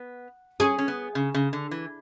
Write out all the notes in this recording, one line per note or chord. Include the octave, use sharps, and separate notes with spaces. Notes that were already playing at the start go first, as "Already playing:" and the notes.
Already playing: B3
C#4 G#4
C#4
B3
C#3
C#3
D3
E3